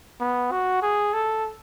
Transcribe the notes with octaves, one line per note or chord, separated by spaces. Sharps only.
B3
F#4
G#4
A4